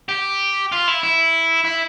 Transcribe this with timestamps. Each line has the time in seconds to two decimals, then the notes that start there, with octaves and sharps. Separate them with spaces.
0.09 G4
0.72 F4
0.88 E4
1.03 E4
1.65 E4